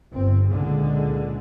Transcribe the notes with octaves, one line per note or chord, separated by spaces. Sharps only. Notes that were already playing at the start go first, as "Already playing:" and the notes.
G1 C4
C#2 A#2 D3 G#3